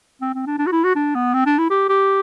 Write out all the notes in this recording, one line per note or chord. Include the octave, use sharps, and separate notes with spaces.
C4
C4
D4
D4
F#4
E4
F#4
D4
B3
C4
D4
E4
G4
G4